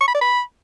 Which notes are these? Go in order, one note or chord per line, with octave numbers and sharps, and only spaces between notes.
C#6
B5
D5
B5